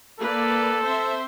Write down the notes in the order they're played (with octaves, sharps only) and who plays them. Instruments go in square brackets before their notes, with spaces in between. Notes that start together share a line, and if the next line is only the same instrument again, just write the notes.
[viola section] A#3 B4 D5 [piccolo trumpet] A4
[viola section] C4 C5 E5